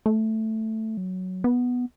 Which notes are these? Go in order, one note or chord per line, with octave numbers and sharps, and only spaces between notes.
A3
F#3
B3